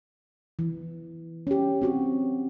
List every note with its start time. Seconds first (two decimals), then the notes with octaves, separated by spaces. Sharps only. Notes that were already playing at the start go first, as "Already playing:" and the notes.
0.59 E3
1.47 C#4 G4
1.82 C4 F#4 G4